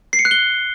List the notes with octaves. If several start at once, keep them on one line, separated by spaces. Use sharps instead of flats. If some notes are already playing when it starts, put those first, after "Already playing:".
C7
C#7
F#6
G7